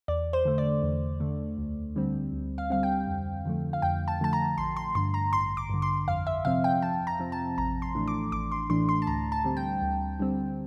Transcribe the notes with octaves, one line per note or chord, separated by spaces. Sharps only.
E2 D5
C5
D3 A3
D5
E2
D3 A3
D2
D3 G3 C4
D2
F5
D3 G3 C4 F5
G5
F2
D3 F3 A3
F5
F2 G5
A5
D3 F3 A3 A5
A#5
A1 C6
C6
G2 D3 C6
A#5
A1 C6
D6
G2 D3
C6
F2 F5
E5
C3 F3 C4 F5
G5
F2 A5
A#5
C3 F3 C4
A5
A1 A#5
C6
A2 E3 A3 D4
D6
A1 D6
C6
A2 E3 A3 D4 C6
C6
A5
D2 A#5
A5
D3 G3 C4
G5
D2
D3 G3 C4